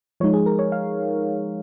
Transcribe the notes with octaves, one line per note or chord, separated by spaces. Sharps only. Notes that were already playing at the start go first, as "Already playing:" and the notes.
F3 G#3 D#4 C#5
G#4
A#4
C#5
F5